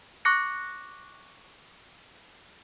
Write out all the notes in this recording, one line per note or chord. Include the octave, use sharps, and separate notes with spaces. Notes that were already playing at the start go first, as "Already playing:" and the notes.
C#6 D6 F#6 A#6 C#7